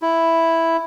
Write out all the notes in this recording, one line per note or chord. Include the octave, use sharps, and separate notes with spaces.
E4